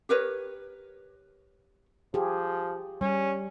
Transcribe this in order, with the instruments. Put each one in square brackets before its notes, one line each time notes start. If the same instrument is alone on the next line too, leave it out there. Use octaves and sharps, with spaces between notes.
[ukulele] G4 A#4 B4 C#5
[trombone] F3 [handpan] G4 G#4
[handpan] G3 [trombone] C#4